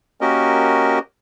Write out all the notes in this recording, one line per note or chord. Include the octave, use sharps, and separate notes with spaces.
A#3 C#4 F#4 G4 A#4 D#5